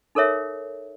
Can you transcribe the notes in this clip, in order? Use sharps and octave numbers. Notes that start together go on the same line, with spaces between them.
D#4 A4 A#4 C#5 E5